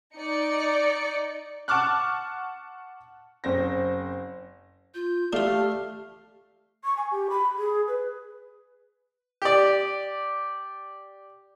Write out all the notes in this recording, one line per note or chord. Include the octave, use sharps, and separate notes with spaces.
D#4 D5 C#7
F#5 A5 C#6 D6 F6 F#6
F#1 C4 A#6
F4 G6
A3 D4 F4 G4 F5 F6
C#6
G#5
G4
B5
G#4
B4
G4 D5